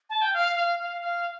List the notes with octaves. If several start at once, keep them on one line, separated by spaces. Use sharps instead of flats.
A5
G5
F5
F5
F5
F5